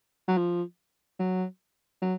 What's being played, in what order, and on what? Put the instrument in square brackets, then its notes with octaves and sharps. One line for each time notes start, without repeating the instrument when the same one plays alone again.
[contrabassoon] F#3
F3
F#3
F#3